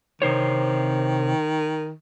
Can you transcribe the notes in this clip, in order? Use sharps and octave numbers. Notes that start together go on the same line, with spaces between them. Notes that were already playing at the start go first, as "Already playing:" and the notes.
C3 D#3 C5 C#5